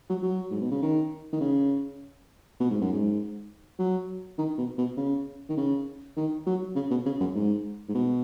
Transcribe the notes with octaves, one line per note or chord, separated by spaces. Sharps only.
F#3
F#3
G#2
B2
C#3
D#3
D#3
C#3
B2
G#2
F#2
G#2
F#3
D#3
B2
B2
C#3
D#3
C#3
D#3
F#3
C#3
B2
C#3
F#2
G#2
G#2
B2